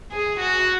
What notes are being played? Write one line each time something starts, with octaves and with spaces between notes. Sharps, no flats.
G#4
F#4